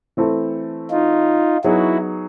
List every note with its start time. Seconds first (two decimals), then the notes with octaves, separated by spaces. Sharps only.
0.17 E3 A3 C4 E4 A4
0.91 D#4 F4
1.64 F#3 B3 D#4 E4 F#4 G#4 C#5